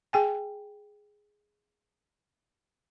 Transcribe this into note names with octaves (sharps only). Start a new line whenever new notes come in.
G#4 G5 G#5